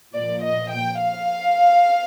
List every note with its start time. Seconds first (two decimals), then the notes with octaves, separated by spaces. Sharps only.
0.14 A#2 F3 D5
0.44 D#5
0.72 G5
1.02 F5